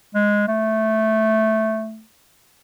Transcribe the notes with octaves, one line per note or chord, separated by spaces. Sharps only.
G#3
A3